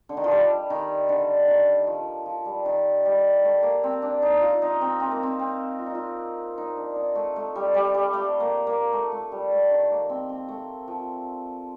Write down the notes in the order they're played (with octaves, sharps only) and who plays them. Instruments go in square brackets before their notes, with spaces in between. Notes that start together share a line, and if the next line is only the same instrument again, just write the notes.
[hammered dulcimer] D3
D#3
F3
G3
D#3
D3
D#3
F3
F3
G3
D#3
G3
A3
A#3
C4
D4
D#4
F4
D#4
C4
C4
A#3
C4
C4
F4
D#4
F4
D#4
D4
D#4
A3
A3
G3
G3
G3
A3
A#3
A#3
A3
A3
G3
A3
D#3
A#3
C4
C4
A3
F3